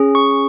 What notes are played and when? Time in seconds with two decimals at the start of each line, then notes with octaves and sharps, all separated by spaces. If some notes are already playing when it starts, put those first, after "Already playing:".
Already playing: C#4 G#4
0.15 C#6